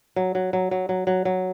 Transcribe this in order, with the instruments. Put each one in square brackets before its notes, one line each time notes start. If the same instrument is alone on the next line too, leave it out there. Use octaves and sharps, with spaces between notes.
[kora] F#3
F#3
F#3
F#3
F#3
F#3
F#3